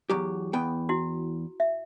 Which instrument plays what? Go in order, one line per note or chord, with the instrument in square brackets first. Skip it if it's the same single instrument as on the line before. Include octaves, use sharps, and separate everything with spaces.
[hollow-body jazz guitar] E2 F#3 G4
E2 B3 G5
[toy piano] E4 F#4
E5